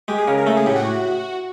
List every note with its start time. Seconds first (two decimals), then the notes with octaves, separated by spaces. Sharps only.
0.08 G#3 G4
0.18 G#4
0.27 C#3 A#4
0.38 A#4
0.46 A3 A4
0.57 G#4
0.66 A2 G4
0.76 F#4